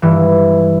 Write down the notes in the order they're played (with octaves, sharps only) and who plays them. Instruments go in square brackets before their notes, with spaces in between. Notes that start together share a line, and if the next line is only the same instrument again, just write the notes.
[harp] G2 E3